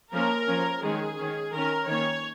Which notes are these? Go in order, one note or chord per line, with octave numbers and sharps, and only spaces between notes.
F3 A#3 C#4 A#4
F3 C#4
D#3 G#3 C#4 G#4
D#3 C#4
D#3 C#4 A#4
D#3 A#3 C#4 C#5